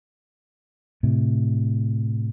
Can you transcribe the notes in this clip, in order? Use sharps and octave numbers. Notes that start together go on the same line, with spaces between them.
A2 C3